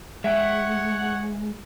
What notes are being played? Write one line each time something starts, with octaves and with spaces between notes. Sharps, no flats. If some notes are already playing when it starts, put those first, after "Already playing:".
G#3 C#5 E5 F#5 G5